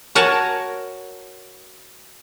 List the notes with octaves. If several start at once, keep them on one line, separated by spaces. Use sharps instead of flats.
F#4 A#4 C#5 F#5 G#5 A5